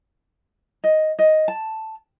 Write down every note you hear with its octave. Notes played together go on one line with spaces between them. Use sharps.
D#5
D#5
A5